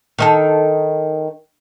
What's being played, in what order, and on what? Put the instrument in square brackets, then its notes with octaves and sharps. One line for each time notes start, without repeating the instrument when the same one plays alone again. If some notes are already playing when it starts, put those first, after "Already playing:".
[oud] D#3 D#4 A4